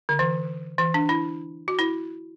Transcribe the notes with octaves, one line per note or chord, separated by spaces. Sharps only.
D3
E3
E3
D4
E4
F#4
E4